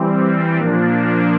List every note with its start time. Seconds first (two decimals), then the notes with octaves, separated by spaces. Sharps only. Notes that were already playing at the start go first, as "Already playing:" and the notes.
Already playing: E3 G3 C4
0.58 A#2 F3 A#3 D4